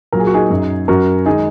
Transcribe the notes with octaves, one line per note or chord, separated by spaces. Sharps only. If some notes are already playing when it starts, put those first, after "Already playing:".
A#2 F#3 A#4
G#4
F#4
D#4 G#4
F#2 F#3
F#2 F#3 F#4 A#4
D#3 G#3 D#4 G#4